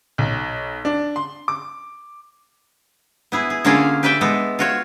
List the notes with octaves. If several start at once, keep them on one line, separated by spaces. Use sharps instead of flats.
B1
D4
C6
D6
B3 E4 G#4
G#4
D3 A#3 C#4 F4 G#4 A4
G4 B4 D5 E5 G5
G#3 B3 A4
F4 F#4 C#5